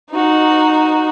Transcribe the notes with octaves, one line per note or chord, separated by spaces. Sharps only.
D#4 F#4